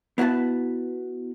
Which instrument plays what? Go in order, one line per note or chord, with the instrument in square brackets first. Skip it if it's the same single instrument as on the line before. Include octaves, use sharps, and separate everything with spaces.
[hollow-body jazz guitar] B3 E4 F#4 B4 A5